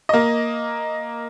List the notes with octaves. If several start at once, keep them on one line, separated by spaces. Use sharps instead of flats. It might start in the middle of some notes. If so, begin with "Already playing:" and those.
A#3 D#5